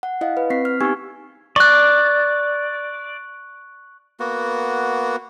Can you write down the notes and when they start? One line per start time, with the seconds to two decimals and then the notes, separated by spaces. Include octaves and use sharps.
0.03 F#5
0.21 E4 D#5 F5
0.37 B4
0.50 C4 B6 C7
0.65 F6
0.81 B3 D#4 G4 G#5 C#6 G#6
1.56 D5 C#6 F#6
4.20 A#3 B3 F#4